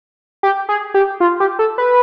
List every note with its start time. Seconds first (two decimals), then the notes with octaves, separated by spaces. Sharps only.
0.43 G4
0.69 G#4
0.94 G4
1.20 F4
1.40 G4
1.59 A4
1.78 B4